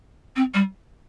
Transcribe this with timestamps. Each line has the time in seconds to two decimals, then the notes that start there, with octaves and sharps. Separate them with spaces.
0.36 C4
0.54 G3